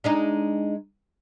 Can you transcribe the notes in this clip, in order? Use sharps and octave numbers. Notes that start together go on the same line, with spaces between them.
G#3 D4 D#4